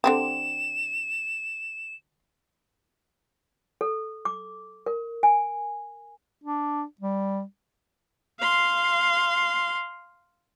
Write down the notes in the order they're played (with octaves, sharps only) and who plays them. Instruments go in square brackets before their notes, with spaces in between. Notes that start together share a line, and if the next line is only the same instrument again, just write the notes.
[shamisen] D3 C4 G4 [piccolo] E7
[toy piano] A4
D6
A#4
G#5
[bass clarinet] D4
G3
[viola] F5 C6